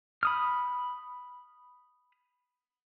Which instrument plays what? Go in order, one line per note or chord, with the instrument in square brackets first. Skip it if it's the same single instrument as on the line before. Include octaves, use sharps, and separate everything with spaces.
[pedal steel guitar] B5 D#6 F6